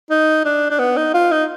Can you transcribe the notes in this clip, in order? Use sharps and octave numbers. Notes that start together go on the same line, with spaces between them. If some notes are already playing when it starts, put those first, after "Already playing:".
D#4
D4
D4
B3
D#4
F4
D#4